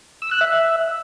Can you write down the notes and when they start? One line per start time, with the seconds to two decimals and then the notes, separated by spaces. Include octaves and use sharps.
0.22 E6
0.31 F#6
0.41 E5